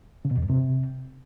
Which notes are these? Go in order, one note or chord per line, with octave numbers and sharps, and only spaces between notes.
C#3
B2
E2
G2
C3